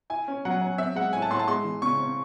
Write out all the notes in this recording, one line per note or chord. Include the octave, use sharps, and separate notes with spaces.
E4 G#5
C#4
F#3 F#5
F#3
C4 E5
G#3 F#5
A2 G#5
A5
A2 C6
A5
G#3 C6
E3
C#3 C#6
C4